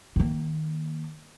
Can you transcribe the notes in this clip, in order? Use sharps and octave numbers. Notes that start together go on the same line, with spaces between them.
D#3 A#3